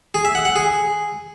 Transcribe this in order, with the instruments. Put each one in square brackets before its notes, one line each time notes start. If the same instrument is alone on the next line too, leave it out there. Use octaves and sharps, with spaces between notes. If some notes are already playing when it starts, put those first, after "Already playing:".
[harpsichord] G#4
E5
F#5
F#5
G#4